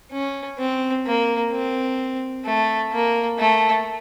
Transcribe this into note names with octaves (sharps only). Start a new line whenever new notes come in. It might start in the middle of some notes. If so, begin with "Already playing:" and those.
C#4
C4
A#3
C4
A3
A#3
A3